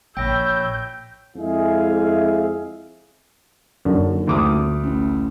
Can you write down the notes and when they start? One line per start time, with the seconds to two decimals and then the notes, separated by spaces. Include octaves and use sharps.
0.17 A#1 C#5 G5 B5 E6 G6 A#6
1.36 F2 G#3 E4 G#4 E5 F5
3.85 D#1 F#2 D3
4.27 D2 D6 D#6
4.83 A1